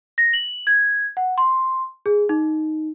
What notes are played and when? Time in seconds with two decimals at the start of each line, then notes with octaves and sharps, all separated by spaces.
0.18 A#6
0.33 F#7
0.67 G#6
1.17 F#5
1.38 C6
2.06 G#4
2.29 D#4